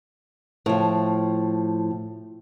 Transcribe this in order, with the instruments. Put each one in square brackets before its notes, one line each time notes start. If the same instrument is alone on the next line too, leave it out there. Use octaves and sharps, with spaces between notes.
[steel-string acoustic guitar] A2 F3